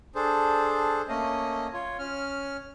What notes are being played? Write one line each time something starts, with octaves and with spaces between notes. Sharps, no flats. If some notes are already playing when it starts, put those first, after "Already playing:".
D4 G#4 A4 C5
A3 A#3 C#4 D#5
F4 C#5
C#4 F6